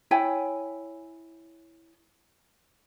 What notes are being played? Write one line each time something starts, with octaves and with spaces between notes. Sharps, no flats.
E4 C#5 G5 G#5